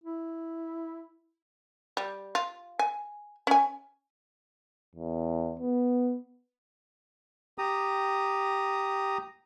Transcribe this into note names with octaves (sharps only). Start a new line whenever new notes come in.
E4
G3
F4
G#5
C#4 G#5
E2
B3
G4 A#5 D#6